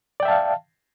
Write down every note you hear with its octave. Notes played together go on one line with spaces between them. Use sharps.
D5 E5 F5 G5 A5